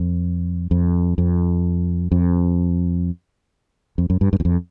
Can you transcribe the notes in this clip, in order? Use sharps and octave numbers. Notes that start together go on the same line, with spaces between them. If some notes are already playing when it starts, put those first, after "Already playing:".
Already playing: F2
F2
F2
F2
F2
F#2
G2
G2
E2
F2